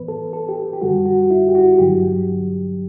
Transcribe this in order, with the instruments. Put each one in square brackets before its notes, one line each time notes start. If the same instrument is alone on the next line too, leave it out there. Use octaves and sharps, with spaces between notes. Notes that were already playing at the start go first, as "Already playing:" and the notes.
Already playing: [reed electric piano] A2 E3 B3 B4
A4
A4
G4
G4
F#2 D3 G3 F#4
F#4
E4
G4
F#4
G2 D3 F#3 G4